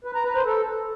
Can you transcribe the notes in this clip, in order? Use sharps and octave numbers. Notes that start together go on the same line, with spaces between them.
B4
A#5
B4
C5
A4